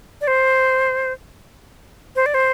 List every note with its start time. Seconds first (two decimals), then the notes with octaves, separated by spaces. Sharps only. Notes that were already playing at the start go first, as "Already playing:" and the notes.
0.21 D5
0.28 C5
2.16 C5
2.26 D5
2.34 C5